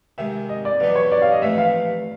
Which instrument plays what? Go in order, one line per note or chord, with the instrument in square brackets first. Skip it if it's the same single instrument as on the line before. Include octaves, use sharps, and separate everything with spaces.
[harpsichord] C3 D#3 G#3 [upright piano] E5
[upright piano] D#5
D5
[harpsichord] E2 B2 F#3 B3 D#4 [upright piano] D5
[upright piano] C#5
D5
F5
D#5
[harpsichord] A#1 A2 E3 A3 [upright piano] E5
[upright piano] F5